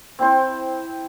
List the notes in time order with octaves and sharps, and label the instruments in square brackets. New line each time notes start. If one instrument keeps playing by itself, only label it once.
[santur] C4 E4 C5